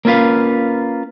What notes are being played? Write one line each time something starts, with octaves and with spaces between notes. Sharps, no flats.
A#3 C#4 F4 B4 F5